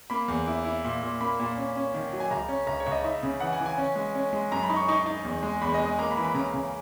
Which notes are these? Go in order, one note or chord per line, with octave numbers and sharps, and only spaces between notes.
A#3 B5
E2
E4
E4
A#2
A#2
A#3 B5
A#2
C#4
C#4
D#3
F#3
G#5
C#2 A#5
C#4
C#2 A#5
C#5
C#2
D#5
D#4 E5
C#3
E3 F#5
G#5
E3
G#5
C#4
G#3
C#4
G#3
F#2 A#5
B5
D#4
C#6
D#4 C#6
D#4
E2
G#3
E2 B5
D#5
G#3
D#5
A#3 A#5
B5
E3
B5
C#3 A#5
C#3